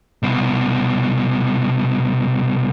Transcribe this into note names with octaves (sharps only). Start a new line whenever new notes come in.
C2 B2